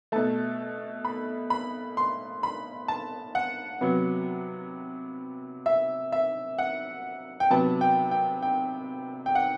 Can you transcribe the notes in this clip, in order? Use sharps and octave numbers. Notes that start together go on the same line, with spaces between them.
B2 A3 A5
B5
B5
C6
B5
A5
F#5
C3 F#3 B3
E5
E5
F#5
G5
C3 F#3 B3 A5
G5
G5
G5
G5
F#5